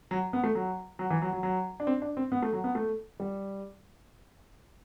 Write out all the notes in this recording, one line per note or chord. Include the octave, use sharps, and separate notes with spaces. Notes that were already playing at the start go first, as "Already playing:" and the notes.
F#3
B3
A3
F#3
F#3
E3
F#3
F#3
F#3
D4
C4
D4
C4
B3
A3
F#3
B3
A3
G3